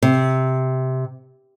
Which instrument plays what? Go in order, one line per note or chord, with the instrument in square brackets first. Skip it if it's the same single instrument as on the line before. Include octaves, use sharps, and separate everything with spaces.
[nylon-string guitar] C3